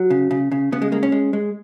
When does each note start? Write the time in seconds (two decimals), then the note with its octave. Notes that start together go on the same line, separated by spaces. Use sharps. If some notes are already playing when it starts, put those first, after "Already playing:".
Already playing: F#3
0.10 C#3
0.31 C#3
0.52 C#3
0.72 C#3 B3
0.82 G#3
0.92 G#3 A#3
1.03 C#4
1.12 G#3
1.33 G#3